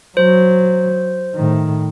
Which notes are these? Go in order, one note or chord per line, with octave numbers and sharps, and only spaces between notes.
F#3 C5
A2 D#3